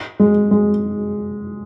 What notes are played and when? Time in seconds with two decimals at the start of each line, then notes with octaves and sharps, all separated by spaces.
0.20 G#3
0.51 G#3